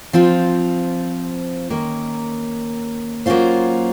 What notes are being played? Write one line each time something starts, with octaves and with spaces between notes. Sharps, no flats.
F3 C4 F4
D#3 A#3 C#4
F#3 A#3 C#4 F4 C5